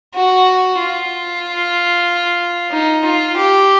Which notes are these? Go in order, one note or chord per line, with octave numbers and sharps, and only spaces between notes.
F#4
F4
D#4
F4
G4